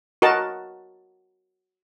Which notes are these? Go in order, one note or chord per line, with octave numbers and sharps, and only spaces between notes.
F#4 A#4 D#5 A5